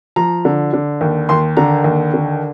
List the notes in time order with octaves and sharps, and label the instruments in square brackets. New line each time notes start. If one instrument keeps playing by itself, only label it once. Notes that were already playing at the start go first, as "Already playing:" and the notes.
[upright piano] F3 A#5
D3
D3
D#2
D#2 C6
D3 A#5
D#2
D3